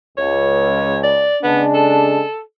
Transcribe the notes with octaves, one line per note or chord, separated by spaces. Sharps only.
C#2 C#5
D5
C#3 G#3 B3 D4
A4